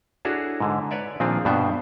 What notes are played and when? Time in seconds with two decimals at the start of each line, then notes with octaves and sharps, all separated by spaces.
0.25 D4 E4 F#4 G#4 A4 C#5
0.60 G#2 D3
0.91 B4 C#5 D5 E5
1.20 A#2 D#3 F3 C4 D4 G#4
1.45 G2 B2 B3 D4 C5 E5